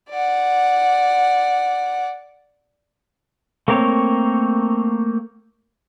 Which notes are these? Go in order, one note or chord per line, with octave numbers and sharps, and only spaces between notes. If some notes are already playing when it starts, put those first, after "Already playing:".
D5 F#5
A3 A#3 C4 A#4 C#5